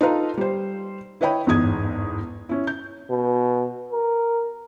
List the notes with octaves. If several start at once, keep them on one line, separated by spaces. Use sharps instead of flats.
D#4 F4 A4 B4 F5 A#5
G3 C5
E4 B4 C#5 D#5 G5 B5
G1 E2 G#2 D#6 G#6
C#4 E4
G6
B2
A#4